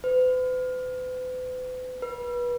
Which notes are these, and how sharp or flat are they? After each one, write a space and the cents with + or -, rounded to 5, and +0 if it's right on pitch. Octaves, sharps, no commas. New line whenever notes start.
B4 +45
B4 -30